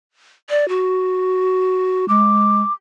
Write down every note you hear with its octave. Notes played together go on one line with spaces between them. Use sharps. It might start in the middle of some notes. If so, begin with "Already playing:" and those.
D5
F#4
G#3 D6